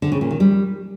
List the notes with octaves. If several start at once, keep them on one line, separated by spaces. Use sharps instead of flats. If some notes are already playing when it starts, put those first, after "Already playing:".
D3
C#3
A#2
D#3
G3